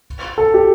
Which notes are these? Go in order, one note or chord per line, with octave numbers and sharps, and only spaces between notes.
A4
G4